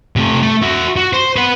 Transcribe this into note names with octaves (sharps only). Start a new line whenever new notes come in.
C3 A3
A3
F#4 E5
F#4
C5
B4 F#5